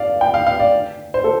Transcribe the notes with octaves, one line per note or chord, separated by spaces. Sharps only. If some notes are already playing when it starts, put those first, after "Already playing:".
Already playing: D5 F5
G5
F5
F5
D5
C5
A4